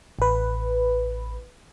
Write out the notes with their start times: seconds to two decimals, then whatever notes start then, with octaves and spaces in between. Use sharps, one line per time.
0.19 A1 B4